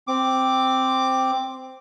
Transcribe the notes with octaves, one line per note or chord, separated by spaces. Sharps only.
C4 D6